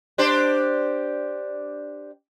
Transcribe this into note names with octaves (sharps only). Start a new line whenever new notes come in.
D4 G4 C5